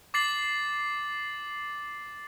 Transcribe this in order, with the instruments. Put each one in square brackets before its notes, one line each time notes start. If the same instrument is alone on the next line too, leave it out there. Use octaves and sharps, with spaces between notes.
[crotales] D6 A6 C7 F#7